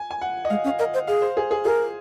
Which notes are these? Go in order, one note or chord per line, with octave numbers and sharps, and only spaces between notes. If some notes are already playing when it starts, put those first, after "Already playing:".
Already playing: G#5
G#5
F#5
D#5
G#3 F5
C#4
F5
A#4 D#5
C5
G#4 F5
C5
G#4
G#4
G#4 A#4